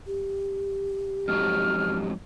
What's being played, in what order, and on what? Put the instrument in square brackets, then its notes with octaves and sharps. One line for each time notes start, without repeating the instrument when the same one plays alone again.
[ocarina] G4
[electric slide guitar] F2 G#2 F#3 [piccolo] F6